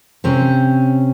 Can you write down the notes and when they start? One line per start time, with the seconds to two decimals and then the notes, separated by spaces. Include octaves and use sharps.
0.24 C3 C4 C#4